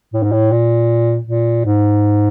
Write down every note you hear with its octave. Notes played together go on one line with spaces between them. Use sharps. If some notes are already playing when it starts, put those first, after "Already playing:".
A2
G#2
A2
A#2
A#2
G#2